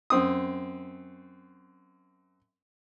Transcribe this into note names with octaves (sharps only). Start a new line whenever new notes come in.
F#2 C4 D#6